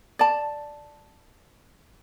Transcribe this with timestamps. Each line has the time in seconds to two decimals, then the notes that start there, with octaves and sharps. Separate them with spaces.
0.19 D5 A5